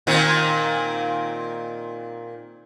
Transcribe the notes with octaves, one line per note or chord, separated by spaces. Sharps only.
A#2 D#3 C4